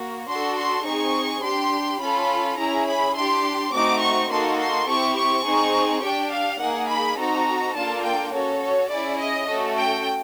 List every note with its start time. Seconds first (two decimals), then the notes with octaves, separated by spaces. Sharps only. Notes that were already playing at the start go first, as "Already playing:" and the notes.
Already playing: A#3 F#4
0.27 D4 F#4 A4 C6
0.56 C6
0.85 C4 D#4 G#4 C#6
1.42 D4 G4 C6
2.00 C#4 F4 A4 B5
2.58 C#4 E4 G#4 A#5
2.86 B5
3.15 D4 G4 C6
3.72 A3 C4 D#4 F#4 D6
4.01 C#6
4.30 A#3 D#4 F#4 A4 C6
4.58 C6
4.87 C4 E4 G4 C#6
5.17 C#6
5.44 C4 D#4 G#4
6.02 D4 G4 G5
6.31 F5
6.60 A#3 D#4 G#4 F#5
6.89 B5
7.17 C4 D#4 F#4 A4 A#5
7.74 A#3 D4 F4 A4 A5
8.03 G5
8.32 C#4 F#4 A4 C#5
8.61 C#5
8.89 C#4 E4 G#4 D5
9.19 D#5
9.47 A3 C#4 F#4 A4
9.76 G5